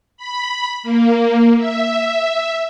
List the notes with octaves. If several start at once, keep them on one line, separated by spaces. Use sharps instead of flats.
B5
A#3
E5